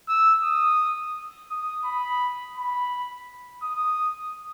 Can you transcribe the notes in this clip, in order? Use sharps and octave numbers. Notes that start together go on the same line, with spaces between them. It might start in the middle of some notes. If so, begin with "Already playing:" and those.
E6
D#6
D#6
B5
B5
D#6